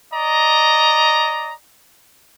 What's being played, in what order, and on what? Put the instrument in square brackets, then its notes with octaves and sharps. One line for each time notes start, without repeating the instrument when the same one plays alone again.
[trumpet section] D5 D#5 A#5